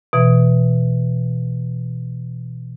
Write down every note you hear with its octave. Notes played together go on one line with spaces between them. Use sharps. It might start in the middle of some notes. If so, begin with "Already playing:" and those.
B2 E3